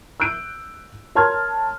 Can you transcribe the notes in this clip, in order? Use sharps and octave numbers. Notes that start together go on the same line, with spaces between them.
E6 F#6 G6 D7
A#4 C#5 A5 C6 F6 G#6